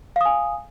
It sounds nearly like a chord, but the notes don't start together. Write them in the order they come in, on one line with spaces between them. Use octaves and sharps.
F5 D#6 G#5